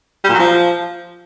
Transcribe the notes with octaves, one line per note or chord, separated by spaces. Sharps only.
G3
A#2
F#3
F3